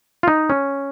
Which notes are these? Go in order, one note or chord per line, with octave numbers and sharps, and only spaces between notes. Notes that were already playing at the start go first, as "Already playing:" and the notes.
F4
D#4
C#4